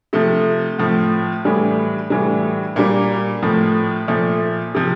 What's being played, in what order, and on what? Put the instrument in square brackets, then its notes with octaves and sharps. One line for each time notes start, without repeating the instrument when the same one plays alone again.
[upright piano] C3 F3 A3
A2 F3
A2 E3 G3
A2 E3 G3
A#2 G3 A#3
A2 F3
A#2 F3 A3
C3 F3